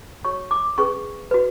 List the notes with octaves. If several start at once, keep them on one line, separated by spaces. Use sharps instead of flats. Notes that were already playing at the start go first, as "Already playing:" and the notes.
F#4 C#5 C#6
D6
C#4 G#4 B4 C#6
F#4 B4